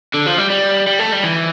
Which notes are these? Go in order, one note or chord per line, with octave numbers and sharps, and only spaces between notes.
D3
F3
G3
G3
G3
A3
G3
E3